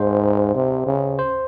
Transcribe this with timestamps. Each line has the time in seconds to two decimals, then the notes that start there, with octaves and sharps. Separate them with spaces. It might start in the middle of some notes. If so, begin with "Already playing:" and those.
Already playing: G#2 C5
0.55 C3
0.86 C#3
1.19 C5